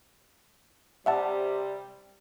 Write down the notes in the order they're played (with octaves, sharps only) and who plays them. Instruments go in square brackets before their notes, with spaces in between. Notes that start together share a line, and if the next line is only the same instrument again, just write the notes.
[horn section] C3 G3 [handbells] E5 F#5 A5